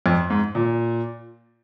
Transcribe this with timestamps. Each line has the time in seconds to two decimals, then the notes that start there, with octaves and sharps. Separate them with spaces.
0.06 F2
0.30 G#2
0.55 A#2